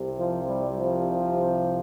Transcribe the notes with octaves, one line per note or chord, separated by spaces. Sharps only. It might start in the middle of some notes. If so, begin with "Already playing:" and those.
Already playing: C2 C3
F3
G3
F3